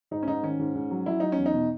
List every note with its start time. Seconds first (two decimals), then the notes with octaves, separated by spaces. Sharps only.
0.11 G#2 D#4
0.23 C#4
0.27 G#2 D#4
0.43 D#3 C#4
0.59 G#2
0.75 G#2
0.91 F#3
1.06 F#3 E4
1.20 F#3 D#4
1.32 C#4
1.38 E2
1.46 D#4
1.54 B2